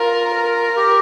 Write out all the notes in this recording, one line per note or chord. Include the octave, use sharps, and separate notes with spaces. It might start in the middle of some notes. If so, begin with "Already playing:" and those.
Already playing: F4 A#4
A#4
G4